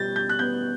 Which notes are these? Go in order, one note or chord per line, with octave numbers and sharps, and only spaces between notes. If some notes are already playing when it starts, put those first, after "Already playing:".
Already playing: B2 G3 B3 G6 A6
G6
F#6
B3 G6